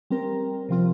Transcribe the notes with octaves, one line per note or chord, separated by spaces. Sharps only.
G3 C4 A#4
C3 F3 C4 F4